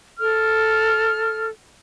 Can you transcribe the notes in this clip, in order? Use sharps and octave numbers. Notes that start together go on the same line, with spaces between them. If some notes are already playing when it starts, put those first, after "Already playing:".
A4 F6